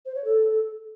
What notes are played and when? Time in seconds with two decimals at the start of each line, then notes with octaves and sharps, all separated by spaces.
0.06 C5
0.15 C#5
0.25 A4